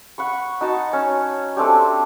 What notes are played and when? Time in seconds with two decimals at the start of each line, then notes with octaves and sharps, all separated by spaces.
0.18 F#5 B5 C#6
0.61 D#4 F#4 A5
0.93 C#4
1.57 A3 C4 D4 G4